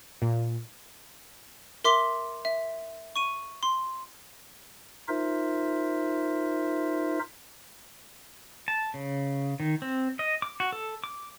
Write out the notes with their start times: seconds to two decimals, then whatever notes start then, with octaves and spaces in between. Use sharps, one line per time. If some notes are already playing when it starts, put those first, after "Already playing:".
0.22 A#2
1.84 A#4 E5 C6 D6 B6 G7
2.45 E5
3.16 C#6 D#7
3.63 C6
5.08 D#4 F4 A#4 C5 E5
8.68 A5
8.94 C#3
9.60 D#3
9.82 C4
10.19 D#5
10.42 D6
10.60 F#4
10.72 A4
11.04 D6